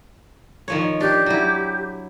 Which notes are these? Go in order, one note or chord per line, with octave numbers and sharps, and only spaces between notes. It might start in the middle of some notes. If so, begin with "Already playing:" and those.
D#3 F3 C#5
D4 G4
F#3 E4